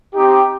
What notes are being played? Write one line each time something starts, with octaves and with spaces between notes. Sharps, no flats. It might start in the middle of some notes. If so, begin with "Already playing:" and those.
C4 D#4 G4